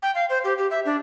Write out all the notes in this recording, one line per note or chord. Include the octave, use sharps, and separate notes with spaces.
G5
F5
C5
G4
G4
E5
D4